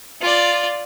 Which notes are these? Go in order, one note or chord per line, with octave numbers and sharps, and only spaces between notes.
F4 D5